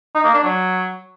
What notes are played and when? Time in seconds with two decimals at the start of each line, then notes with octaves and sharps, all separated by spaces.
0.15 D#4
0.24 A#3
0.34 D4
0.44 F#3